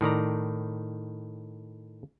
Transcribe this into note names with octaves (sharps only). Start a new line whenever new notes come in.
A2 D#3 D5 A#5